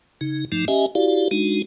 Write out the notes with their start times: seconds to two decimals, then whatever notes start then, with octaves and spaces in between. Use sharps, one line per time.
0.21 C#3 D#4
0.52 G2 F3 A3 D#4
0.68 C#4 G4 D#5 E5 G#5
0.95 E4 F#4 G4 D5 F5
1.31 G#3 D4 D#4 F#4